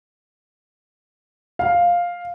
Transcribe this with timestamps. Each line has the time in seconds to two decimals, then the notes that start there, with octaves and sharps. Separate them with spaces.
1.59 F5